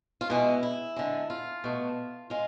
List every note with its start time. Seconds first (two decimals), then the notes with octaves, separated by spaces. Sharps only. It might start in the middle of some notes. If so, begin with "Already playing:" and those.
0.21 F4
0.30 B2 G#3 E4
0.63 E4
0.96 D3 G#3
1.30 F4
1.64 B2 A3
2.30 G#3 F4